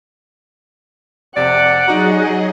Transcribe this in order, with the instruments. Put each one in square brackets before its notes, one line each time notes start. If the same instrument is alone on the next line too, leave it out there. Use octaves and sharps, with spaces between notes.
[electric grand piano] F2 C3 [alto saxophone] D5 [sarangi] F#5
[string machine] F#3 G#4 D#5 [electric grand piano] D#4 A#5 [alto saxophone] F#4